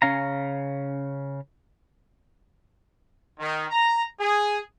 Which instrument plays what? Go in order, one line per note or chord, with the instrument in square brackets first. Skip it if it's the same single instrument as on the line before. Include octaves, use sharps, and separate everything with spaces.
[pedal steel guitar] C#3 C#4 F5 A#5
[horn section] D#3
A#5
G#4